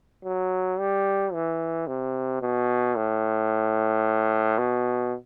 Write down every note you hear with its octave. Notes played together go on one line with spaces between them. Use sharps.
F#3
G3
E3
C3
B2
A2
B2